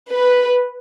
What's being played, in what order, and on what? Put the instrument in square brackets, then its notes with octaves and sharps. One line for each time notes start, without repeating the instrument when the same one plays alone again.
[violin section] B4